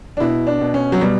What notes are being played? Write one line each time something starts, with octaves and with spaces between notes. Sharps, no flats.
D4
B2 E4
D4
B2
C#4
F#3
B2 G3